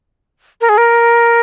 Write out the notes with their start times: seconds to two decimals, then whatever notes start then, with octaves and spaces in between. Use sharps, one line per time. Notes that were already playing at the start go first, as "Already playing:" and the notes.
0.61 A#4
0.69 G#4
0.78 A#4